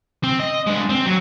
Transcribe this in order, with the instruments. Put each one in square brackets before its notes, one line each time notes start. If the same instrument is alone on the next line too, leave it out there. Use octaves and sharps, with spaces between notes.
[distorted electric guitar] C4
D#5
G#3 D4
C4
F#3